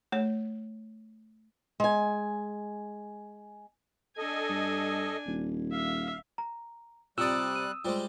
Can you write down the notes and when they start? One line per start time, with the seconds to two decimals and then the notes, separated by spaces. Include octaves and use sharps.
0.12 A3 C#5
1.80 G#3 G#5
4.18 D4 A4 D#5 G#5
4.49 G2
5.26 D#1
5.72 E5 F5
6.38 A#5
7.18 C3 G3 F4 D5 D#6 E6 F#6
7.55 D#7
7.85 G3 G#3 F4 C5